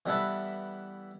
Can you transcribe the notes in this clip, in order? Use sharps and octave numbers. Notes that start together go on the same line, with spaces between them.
E3 G3 B3 E4 A4 B4